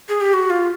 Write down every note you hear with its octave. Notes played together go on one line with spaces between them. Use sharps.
G#4
G4
F#4
F4